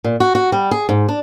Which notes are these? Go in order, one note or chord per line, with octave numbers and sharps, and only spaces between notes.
A#2
F#4
F#4
G3
G#4
G#2
D4